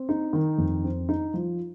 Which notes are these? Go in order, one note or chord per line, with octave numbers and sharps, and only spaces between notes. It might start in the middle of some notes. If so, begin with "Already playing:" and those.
Already playing: C4
D#4
D#3
F2
C4
D#4
F3